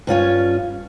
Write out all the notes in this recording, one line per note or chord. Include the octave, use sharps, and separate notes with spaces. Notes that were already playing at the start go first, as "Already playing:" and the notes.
G2 C#4 F4 C#5